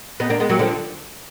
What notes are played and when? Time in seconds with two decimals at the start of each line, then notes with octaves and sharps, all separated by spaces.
0.20 B3 D#4
0.30 A#3 D4
0.40 G#3 B3
0.49 F#3 A#3
0.59 D3 F3